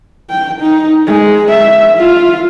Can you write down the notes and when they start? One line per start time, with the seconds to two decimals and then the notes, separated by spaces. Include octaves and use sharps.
0.30 G5
0.61 D#4
1.07 G#3
1.50 E5
1.97 F4